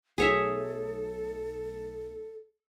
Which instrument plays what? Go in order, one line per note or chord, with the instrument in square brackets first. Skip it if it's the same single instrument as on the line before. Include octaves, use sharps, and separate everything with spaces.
[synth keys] B1 A3 D#4 [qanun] G#4 C#5 E5 [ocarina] A4